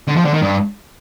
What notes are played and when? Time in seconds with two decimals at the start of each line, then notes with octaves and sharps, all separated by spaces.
0.08 D3
0.16 F3
0.25 D3
0.34 D#3
0.42 G2